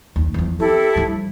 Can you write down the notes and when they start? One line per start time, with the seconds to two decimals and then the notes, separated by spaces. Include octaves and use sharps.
0.16 D#2
0.34 E2 F3
0.60 C4 E4 G4 A4
0.95 G2 F3